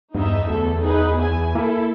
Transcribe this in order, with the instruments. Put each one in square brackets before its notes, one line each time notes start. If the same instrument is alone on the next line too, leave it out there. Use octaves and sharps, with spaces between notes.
[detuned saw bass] E2 [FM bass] G2 [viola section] D#4 E5
[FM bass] D2 [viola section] A4
[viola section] D#4 G#4 B4
E4 G#5
[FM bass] A#3 [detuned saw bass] E4 [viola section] A4